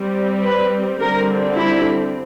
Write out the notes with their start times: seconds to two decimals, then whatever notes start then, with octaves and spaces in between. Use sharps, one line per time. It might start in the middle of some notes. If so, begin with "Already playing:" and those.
Already playing: G3 C4
0.43 B4
1.00 D3 G3 C4 A#4
1.56 E4